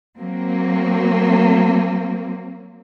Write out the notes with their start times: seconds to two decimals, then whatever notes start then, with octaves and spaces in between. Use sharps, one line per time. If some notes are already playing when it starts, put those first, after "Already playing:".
0.19 F#3 A#3 C4